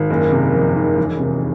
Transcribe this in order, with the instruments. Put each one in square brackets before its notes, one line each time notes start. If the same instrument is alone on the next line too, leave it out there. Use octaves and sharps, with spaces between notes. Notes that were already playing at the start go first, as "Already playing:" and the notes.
Already playing: [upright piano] G#1
F#1
C3
F2
D#3
E1
C3